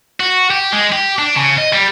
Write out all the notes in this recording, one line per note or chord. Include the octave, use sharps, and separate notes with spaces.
F#4
G4
G#3
G4
D4
C#3
D#5
G3